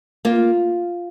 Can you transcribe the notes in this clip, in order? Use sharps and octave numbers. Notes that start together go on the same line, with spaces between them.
A#3 F4